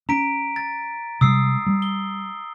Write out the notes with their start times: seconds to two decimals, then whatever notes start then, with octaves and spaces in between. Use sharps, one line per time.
0.09 C#4 A#5 B6 D7
0.56 A6
1.21 C3 G3 G#3 D#6 E6 C7
1.66 G3
1.82 G7